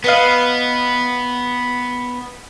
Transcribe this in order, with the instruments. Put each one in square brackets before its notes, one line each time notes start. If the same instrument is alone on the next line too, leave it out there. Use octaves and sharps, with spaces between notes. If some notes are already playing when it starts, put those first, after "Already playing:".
[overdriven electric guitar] B3 [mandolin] B4 D#5 F5